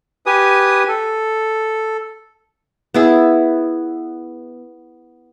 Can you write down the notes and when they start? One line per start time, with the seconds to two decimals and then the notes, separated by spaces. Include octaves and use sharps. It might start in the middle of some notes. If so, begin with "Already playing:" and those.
0.26 G4 B4 G#5 D#6
0.88 A4
2.94 B3 E4 G#4